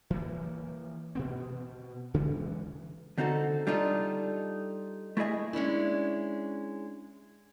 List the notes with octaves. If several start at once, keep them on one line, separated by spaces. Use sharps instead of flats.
E3 F3 A#3
B2 B3 C4
C#3 E3 F#3 G#3
D3 C4 D#4 F#4 A4
G3 D4 D#4 F4 A4
A3 E4 G#4 D#5 G#5
G#3 C#4 D4 E4